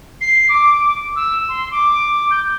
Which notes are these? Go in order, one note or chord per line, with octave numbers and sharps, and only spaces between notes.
C7
D6
E6
C6
D6
G6